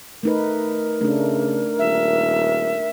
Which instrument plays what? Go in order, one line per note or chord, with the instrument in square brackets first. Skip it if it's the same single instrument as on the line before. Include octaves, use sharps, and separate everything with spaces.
[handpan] A3 D#4 B4 [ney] A#4
[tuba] C#3 [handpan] A3 D4
[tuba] D#1 [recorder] E5